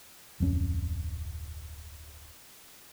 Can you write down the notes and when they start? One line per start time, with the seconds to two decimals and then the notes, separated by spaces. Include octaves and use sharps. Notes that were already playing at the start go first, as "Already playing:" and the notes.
0.40 D1 F2 G#3 C#4